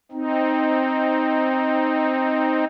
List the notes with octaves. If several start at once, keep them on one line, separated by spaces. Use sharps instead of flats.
C4 D#4